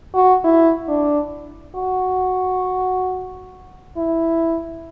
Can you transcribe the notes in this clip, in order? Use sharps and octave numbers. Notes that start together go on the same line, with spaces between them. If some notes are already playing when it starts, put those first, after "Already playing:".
F#4
E4
D4
F#4
E4